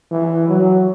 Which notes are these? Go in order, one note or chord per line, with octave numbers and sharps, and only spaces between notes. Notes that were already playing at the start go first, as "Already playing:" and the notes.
E3
F#3